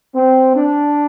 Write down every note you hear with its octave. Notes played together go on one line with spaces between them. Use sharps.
C4
D4